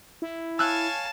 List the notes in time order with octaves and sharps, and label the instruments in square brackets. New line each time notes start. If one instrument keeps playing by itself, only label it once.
[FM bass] E4
[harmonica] C#5 F5 G#5 [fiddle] A5 [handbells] E6 F#6